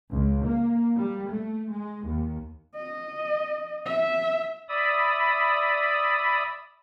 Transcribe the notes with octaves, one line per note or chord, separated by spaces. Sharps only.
C#2
A#3
G3
A3
G#3
D#2
D#5
E5
D5 E5 B5 D#6